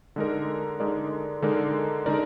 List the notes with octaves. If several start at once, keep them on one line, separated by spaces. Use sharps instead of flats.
D3 G#3 D#4 A#4 D5
D3 G#3 D#4 A#4 D5
D3 G#3 D#4 A#4 D5
D3 G#3 D#4 A#4 D5